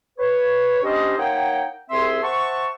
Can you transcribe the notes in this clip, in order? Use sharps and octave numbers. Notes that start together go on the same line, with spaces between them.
B4 C#5
G3 C#4 D4 G4 C5 D#5
A#3 D#4 C#5 F#5 G5
C2 C4 G#4 E5 C6
C5 E5 F#5 A5 C#6